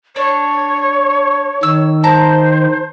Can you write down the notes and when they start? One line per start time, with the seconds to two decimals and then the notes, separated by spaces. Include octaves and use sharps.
0.16 D4 C#5
1.63 D#3 E6
2.03 C5 A5 A#5